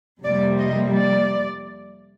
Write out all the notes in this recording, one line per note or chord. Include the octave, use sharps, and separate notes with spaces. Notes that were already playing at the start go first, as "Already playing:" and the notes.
F2 C3 G3 A#3 D5
D#5
D5